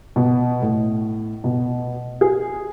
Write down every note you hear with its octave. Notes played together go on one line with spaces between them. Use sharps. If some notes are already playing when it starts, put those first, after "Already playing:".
B2
A2
B2
G#4